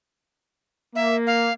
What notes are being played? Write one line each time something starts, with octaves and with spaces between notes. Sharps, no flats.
A#3 E5
F5